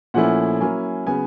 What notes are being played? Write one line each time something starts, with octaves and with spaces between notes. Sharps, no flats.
A#2 F3 A3 C#4 E4 F#5
F#3 A#3 C#4 E4 G#5
C#3 F#3 B3 G#5